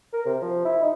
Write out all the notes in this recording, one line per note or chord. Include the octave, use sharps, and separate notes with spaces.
A#4
C3
F3
E4
D#4